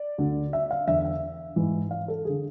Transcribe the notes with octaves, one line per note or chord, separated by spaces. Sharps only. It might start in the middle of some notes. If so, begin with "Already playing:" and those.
Already playing: D5
D2 D3
E5
F5
E2 D3 E5
E5
G#2 E3
F5
A4
D3 G#4